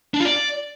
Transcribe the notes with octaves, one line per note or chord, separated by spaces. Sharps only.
D4
F4
D5